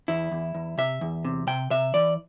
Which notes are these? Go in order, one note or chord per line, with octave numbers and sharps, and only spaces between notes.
E2 E4
E2
E2
C3 E5
E2
C3
C3 G5
C3 E5
E3 D5